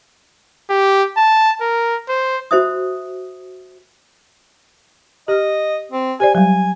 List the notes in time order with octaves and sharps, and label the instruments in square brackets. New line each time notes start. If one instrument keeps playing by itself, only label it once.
[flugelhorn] G4
A5
A#4
C5
[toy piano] F#4 C5 E5 D#6
[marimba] G4 F6 [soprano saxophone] D#5
[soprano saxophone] C4
[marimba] G4 C5 D5 [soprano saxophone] G#5
[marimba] F#3 G3 [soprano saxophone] G#5